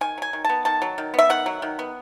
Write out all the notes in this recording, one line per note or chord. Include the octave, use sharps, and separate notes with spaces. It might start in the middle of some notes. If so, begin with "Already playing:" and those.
D#3 G#5
F#3 G#5
D#3
B3 A5
D#3 A5
F#3
D#3
B3 E5
D#3 F#5
F#3
D#3
B3